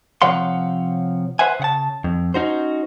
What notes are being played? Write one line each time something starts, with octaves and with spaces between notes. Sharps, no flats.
C3 F3 C#5 F5 F#5 C6
B4 C5 E5 F#5 G#5
C#3 F#5 A5
F2
C#4 D#4 F#4 C5